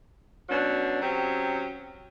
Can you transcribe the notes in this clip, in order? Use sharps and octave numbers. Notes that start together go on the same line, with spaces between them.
B2 F#3 C#4 D4
F#3 C4 C#4 G4